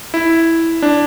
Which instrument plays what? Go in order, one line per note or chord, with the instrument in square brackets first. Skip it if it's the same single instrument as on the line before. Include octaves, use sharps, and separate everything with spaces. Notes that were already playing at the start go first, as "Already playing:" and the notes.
[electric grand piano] E4
D4